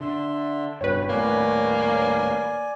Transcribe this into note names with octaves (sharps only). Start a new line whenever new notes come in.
D3 E5 C6
F#1 G2 B2 B4 C#5 G5
D#1 A2 A#3 D5 G#5